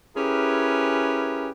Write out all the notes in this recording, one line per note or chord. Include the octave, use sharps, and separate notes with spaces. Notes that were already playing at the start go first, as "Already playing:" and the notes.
C#4 E4 G4 G#4 A#4 B4